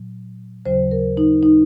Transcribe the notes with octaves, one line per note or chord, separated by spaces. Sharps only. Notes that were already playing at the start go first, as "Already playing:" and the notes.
Already playing: A#2 F#3
D#2 C#3 F#3 C5
A#4
D#4
D#4